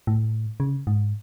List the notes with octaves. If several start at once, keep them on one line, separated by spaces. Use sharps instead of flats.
A2
C#3
G#2